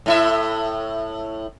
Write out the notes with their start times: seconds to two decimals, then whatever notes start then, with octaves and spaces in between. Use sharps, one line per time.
0.06 A2 E4 E5